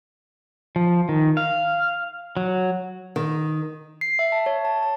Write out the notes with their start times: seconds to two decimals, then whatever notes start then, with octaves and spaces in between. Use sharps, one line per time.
0.76 F3
1.09 D#3
1.37 F5
2.37 F#3
3.16 D#3
4.01 C7
4.19 E5
4.32 A5
4.46 C#5
4.65 A5
4.83 A5